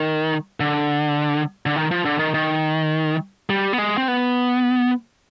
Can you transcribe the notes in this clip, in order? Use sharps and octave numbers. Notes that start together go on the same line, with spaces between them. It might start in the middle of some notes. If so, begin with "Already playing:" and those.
Already playing: D#3
D3
D3
D#3
F3
D3
D#3
D#3
G3
B3
G#3
C4
B3